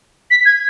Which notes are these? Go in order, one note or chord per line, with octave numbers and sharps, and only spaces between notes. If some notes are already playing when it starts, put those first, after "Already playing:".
B6
G#6